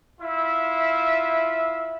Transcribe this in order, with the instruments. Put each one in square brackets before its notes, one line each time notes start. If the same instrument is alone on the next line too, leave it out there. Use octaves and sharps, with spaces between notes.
[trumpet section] E4 F4 E5